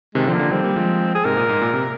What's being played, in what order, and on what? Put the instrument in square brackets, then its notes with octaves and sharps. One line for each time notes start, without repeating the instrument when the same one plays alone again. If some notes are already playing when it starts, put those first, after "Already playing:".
[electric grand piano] C3 D#3 [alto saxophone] G#3
[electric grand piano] D3 F3 [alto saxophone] C4
[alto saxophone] A#3
[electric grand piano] D3 F3
[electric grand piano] D#3 G3 [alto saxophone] C4
[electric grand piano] G3 A#3
F3 G#3
[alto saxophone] G#4
[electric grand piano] G#2 C3 [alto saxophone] A#4
[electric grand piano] A#2
G#2
A#2
C3